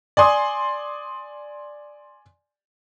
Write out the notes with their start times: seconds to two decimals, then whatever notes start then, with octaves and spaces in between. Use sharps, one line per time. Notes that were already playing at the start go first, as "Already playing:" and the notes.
0.17 D5 G#5 C6 D#6